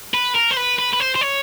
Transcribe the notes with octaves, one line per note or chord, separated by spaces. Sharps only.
B4
A#4
C5
B4
B4
B4
C5
C5
C#5